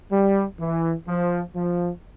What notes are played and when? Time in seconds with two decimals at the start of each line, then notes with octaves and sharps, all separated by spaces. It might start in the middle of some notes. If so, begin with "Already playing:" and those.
0.11 G3
0.59 E3
1.08 F3
1.55 F3